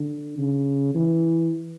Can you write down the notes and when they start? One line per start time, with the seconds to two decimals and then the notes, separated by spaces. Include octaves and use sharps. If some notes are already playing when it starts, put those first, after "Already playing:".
Already playing: D3
0.38 C#3
0.94 E3